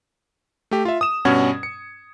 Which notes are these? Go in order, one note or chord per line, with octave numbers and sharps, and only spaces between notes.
A3 G4
F4 E5
D#6 E7
G2 B2 C#4 F#5 G#6
C#7